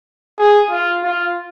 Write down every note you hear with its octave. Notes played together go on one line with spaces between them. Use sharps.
G#4
F4
F4